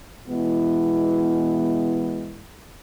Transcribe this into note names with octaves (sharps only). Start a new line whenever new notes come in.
B2 E3 G#3 B3 E4